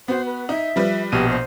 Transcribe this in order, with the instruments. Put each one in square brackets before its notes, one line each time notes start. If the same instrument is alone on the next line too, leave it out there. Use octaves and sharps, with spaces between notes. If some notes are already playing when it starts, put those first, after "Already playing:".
[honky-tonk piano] B3 F#4 [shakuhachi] C5
[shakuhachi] B4
[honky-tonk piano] D#4 [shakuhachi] E5
[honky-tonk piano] F3 G3 B4
[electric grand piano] A#1 B2 D#7 [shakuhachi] G4
[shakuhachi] C5